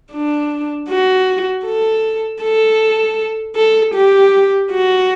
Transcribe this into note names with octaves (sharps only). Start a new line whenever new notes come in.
D4
F#4
A4
A4
A4
G4
F#4